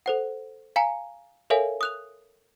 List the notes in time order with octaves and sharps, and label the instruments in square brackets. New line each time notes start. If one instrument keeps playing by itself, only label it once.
[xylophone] A4 C5 F#5
F5 G#5 A#5 C#7
A4 A#4 C#5 E5 F5 G#5
D#6 F#6 F7